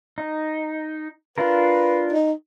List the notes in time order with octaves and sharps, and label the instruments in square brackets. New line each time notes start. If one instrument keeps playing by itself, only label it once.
[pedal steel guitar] D#4
[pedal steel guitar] D4 F4 A#4 [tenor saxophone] B4
[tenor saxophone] D#4